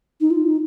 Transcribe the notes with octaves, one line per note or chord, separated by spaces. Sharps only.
D#4
F4
D#4